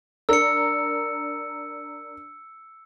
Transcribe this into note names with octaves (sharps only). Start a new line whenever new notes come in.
D4 A#4 E6 C#7